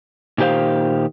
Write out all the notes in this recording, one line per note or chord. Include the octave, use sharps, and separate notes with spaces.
A#2 D#3 G4 C5 F5